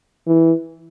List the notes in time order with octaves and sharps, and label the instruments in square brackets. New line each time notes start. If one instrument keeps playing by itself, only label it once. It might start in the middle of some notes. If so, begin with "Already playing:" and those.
[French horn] E3